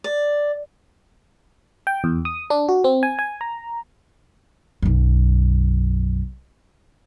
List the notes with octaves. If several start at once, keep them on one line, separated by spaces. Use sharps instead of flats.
D5
G5
E2
D#6
D4
F#4
C4
G#5
G#5
A#5
B1 F#2